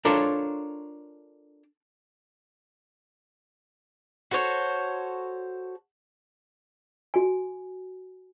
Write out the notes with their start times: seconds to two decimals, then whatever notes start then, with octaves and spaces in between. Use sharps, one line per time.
0.05 D4 F4 A4 A#4 C5 C#5
4.31 F#4 A4 C5 C#5
7.14 F#4 G#5